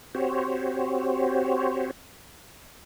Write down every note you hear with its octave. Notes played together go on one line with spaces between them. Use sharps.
C4 F#4 G4 C5 C#5